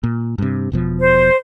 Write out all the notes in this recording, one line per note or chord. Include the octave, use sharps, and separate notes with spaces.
A#2
G2 C3
E1 B2 F3
C5